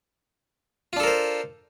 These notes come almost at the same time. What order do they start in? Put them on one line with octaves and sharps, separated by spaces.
F4 D4 A4 A#4 C5